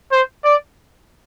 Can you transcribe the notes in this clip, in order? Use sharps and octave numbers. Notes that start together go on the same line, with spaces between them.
C5
D5